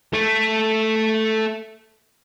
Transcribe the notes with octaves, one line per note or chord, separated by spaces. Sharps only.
A3